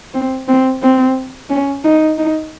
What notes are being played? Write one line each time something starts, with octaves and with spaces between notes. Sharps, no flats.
C4
C4
C4
C#4
D#4
D#4